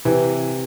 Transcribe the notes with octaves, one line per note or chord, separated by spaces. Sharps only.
C3 E3